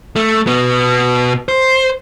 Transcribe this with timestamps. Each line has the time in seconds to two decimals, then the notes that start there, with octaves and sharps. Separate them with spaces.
0.16 A3
0.47 B2 B3
1.48 C5